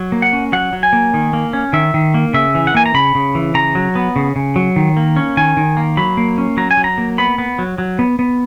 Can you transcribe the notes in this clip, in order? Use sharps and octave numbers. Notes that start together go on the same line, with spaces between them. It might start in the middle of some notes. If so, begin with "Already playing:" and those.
Already playing: F#3
A#3
F#5
C#4
F#3 F#5
F#3
G#5
A#3
D#3
A#3
C#4
D#3 E5
D#3
A#3
C#3 E5
E3
F#5
A#3 G#5
A#5
C#3 B5
C#3
E3
C#3 A#5
F#3
B3
C#3
C#3
F#3
D#3
A#3
C#4
D#3 G#5
D#3
A#3
F#3 B5
A#3
C#4
F#3 A#5
G#5
F#3
A#5
A#3
B3 B5
B3
F#3
F#3
B3
B3